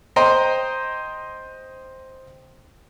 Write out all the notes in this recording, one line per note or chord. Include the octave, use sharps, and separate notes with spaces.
C5 D#5 G5 A#5 C6